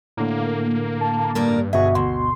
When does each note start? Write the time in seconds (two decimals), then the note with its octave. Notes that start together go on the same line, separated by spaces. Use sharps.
0.17 A2 D3 A#3
1.01 A5
1.35 G2 A#3 A#4 D5
1.73 G1 B2 F#4 G#4 E5
1.95 D2 C6